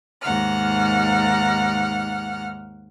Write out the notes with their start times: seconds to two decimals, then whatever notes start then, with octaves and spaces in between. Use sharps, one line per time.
0.23 D#2 G#2 F#5 F6